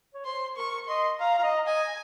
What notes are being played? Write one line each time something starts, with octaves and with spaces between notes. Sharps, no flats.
C#5
C5 C6
A#4 C#6
D#5 C6
F5 A#5
F5
D#5
D#5 G#5